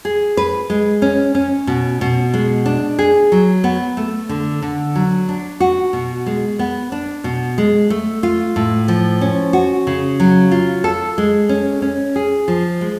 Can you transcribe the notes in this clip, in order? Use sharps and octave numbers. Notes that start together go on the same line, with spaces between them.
G#4
B4
G#3
C#4
C#4
B2
B2
G#3
D4
G#4
F#3
B3
A3
D3
D3
F#3
D4
F#4
B2
G#3
B3
D4
B2
G#3
A3
F4
A2
F3
C#4
F#4
C#3
F#3
F4
A4
G#3
C#4
C#4
G#4
F3
G#3